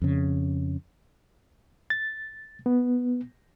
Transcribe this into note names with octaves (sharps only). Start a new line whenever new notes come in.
F2 C#3
A6
B3